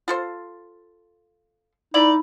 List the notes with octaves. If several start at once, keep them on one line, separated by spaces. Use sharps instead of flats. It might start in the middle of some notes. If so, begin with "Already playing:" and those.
F4 A4 C5
D#4 E4 D5 B5